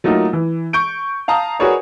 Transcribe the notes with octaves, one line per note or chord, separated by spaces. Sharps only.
F#3 A3 A#3 D#4 F4
E3
C#6 G6 D7
F5 A5 A#5 D#6
F#4 G#4 A#4 B4 C#5 D5